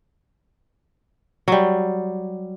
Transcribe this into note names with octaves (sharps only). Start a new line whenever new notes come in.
F#3 G3